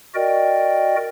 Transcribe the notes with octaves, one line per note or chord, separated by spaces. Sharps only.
F#4 A#4 D5 D#5 G5